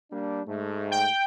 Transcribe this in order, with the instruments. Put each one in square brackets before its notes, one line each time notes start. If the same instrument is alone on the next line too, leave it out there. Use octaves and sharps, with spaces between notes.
[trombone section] G3 A#3 D4
G#2 A3
[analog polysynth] G5